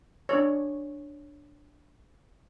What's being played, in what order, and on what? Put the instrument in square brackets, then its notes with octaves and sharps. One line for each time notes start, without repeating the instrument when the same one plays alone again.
[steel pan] D4 C#5